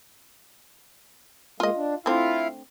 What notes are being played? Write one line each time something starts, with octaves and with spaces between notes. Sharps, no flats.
G#3 A#3 F4 D#5
D4
D3 A3 C4 E4 F4 F5